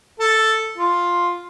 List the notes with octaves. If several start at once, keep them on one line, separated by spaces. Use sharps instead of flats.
A4
F4